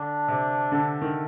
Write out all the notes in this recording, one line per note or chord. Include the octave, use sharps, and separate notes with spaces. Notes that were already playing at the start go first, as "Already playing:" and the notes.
Already playing: D3 D4
C3
D3
D#3